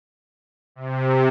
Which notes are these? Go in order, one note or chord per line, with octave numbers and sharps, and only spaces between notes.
C3